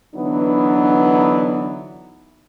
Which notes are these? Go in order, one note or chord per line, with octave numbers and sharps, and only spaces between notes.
D3 E3 F#3 B3 D4 D#4